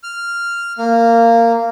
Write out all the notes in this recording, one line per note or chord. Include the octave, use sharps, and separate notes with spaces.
F6
A#3